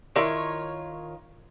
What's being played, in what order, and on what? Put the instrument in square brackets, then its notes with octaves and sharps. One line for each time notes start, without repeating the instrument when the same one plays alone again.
[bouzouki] D#3 F4 C#5 [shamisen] E4 A#4 D5